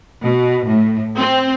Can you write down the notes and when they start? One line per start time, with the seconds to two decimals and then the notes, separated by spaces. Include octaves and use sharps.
0.23 B2
0.66 A2
1.16 C4